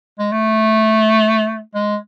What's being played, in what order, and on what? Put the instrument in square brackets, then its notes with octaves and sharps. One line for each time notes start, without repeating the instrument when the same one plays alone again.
[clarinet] G#3
A3
G#3